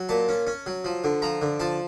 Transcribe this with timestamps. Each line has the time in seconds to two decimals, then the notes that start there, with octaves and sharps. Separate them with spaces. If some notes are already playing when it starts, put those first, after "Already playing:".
Already playing: F#3
0.09 A#2 A5
0.29 C#4
0.47 C#4
0.66 F#3
0.85 F3
1.04 D3
1.22 F3 A#5
1.42 D3
1.60 F3 A5